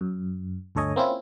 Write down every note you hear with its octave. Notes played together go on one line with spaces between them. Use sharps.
F#2
G1 D2 A4 C#5 D#5 G#5
A#3 C4 C#4 E4 F4